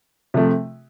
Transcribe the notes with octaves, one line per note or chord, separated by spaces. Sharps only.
C3 F3 A3